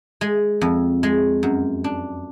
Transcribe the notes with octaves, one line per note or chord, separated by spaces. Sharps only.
G#3
F2
G#3
F#2
D4